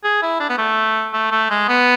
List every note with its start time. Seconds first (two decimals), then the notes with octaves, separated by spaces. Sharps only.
0.04 G#4
0.22 E4
0.40 D4
0.49 B3
0.58 A3
1.14 A3
1.31 A3
1.50 G#3
1.69 B3